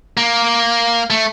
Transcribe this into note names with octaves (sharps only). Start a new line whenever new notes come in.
A#3
A3